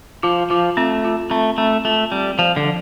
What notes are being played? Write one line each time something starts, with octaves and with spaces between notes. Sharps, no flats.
F3 F4
F3 F4
A3 C4
F4
A3 C4
A3 C4
A3 F4
G3 C4
F3 D5
D3
F3